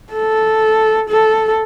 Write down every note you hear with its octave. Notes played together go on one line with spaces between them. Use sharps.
A4
A4